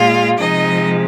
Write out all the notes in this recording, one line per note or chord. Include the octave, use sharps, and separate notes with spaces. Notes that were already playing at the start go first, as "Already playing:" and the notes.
Already playing: A#2 G#3 F4 F5
C3 F3 G#3 D#4 D#5